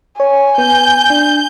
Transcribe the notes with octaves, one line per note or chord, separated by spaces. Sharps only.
C#5 G#5
B3 G6
D4